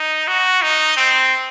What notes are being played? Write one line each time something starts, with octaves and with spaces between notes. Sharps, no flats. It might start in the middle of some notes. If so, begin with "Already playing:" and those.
Already playing: D#4
F#4
D#4
C4